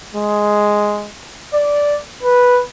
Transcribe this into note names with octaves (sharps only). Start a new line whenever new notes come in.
G#3
D5
B4